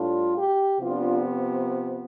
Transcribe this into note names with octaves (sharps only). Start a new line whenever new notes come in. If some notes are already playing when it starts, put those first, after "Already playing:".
Already playing: A2 G3 D4 F4
G4
C3 F3 B3 D4 F4